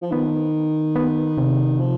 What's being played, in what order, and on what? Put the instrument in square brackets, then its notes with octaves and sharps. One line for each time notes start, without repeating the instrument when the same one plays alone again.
[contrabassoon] F3
[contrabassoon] D#3 [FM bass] B3
[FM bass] B3
C3
[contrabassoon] F3